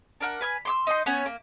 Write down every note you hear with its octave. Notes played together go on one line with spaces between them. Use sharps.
D4 A#4 F#5
B4 G#5 F6
C6 D6 E6
D#4 D#5 C6
B3 C#4 C#5
A#3